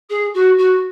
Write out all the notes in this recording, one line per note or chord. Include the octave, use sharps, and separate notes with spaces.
G#4
F#4
F#4